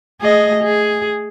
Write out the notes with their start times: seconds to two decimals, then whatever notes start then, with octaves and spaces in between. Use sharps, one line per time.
0.21 A3 G#4 D#5
0.63 G#4